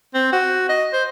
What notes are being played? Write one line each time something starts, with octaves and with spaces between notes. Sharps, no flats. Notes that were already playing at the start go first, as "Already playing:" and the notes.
C4
F#4
D#5
C5